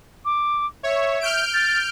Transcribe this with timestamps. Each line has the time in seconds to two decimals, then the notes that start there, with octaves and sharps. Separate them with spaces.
0.25 D6
0.83 C#5 E5
1.21 F6 G6 D7
1.53 A6